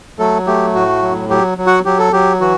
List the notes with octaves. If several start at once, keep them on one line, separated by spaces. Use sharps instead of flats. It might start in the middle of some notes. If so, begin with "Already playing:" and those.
F#3 A3 A4
A3 G4
A2 F#4
F#3
F#3 G4
F#3
F#4 F#5
F#3 G4
A4
F#3 G4
E3 F#4